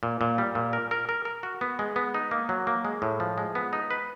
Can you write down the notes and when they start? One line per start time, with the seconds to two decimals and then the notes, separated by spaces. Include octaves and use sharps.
0.03 A#2
0.21 A#2
0.38 G3
0.55 A#2
0.73 A#4
0.91 A#4
1.09 A#4
1.25 A#4
1.43 F#4
1.61 B3
1.79 G#3
1.96 B3
2.14 D#4
2.31 A#3
2.49 F#3
2.67 A#3
2.85 G#3
3.02 A2
3.20 F3
3.38 G#3
3.55 B3
3.73 D#4
3.91 B4